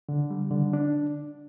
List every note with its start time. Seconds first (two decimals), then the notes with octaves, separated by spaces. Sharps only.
0.09 D3
0.30 G3
0.51 D3
0.73 D4